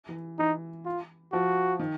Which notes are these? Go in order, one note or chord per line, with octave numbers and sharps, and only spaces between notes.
E3
E3 D#4
F4
F3 F#4
D#3